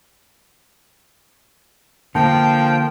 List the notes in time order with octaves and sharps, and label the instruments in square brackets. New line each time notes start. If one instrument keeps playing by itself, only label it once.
[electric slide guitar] D3 A#3 [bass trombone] F3 [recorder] G5 [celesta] A5